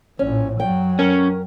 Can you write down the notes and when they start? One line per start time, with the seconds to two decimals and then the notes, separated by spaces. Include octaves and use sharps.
0.19 A#1 A2 C#4
0.60 F#2 F#3 G5
0.99 C#4 A#4